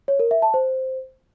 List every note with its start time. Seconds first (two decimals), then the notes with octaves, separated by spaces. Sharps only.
0.08 C#5
0.20 A#4
0.31 E5
0.42 A5
0.54 C5